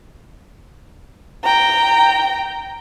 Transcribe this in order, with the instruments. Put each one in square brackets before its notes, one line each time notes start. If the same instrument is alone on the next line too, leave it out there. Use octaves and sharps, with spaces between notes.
[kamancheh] G5 A#5